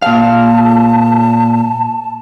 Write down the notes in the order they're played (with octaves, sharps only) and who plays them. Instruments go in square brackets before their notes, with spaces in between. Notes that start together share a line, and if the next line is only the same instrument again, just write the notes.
[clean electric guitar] A#2 F5 [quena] A5